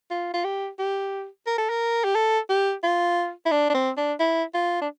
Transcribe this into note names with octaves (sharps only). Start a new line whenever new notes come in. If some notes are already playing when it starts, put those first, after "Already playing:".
F4
F4
G4
G4
A#4
A4
A#4
G4
A4
G4
F4
E4
D4
D4
C4
D4
E4
F4
D4